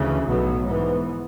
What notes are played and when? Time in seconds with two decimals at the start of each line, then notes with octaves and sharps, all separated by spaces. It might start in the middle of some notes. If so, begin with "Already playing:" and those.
Already playing: D2 C#3 E3
0.26 B1 A2 F#3 B3
0.66 G#2 E3 B3